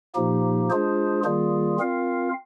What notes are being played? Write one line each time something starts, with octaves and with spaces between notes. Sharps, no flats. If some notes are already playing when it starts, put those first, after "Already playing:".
A#2 F3 A#3 D#4 G4
G#3 D4 F4 G#4 C5
D#3 G3 A#3 F4 G#4
C4 F4 A#4 F5